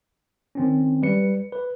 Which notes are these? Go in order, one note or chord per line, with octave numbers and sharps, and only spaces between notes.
D#3 C4 C#4
G3 B4 C#7
B4